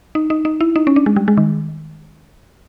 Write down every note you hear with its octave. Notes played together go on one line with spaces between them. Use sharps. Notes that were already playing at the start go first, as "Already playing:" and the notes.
D#4
D#4
D#4
E4
D#4
C#4
D4
G#3
G3
G#3
D#3